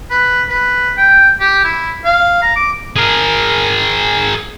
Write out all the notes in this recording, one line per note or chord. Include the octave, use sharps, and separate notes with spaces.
B4
B4
G5
G4
E4
F5
A#5
D6
G#4 A#4